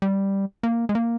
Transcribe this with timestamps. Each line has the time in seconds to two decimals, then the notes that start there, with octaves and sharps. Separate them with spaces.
0.02 G3
0.63 A#3
0.89 G#3
0.95 A#3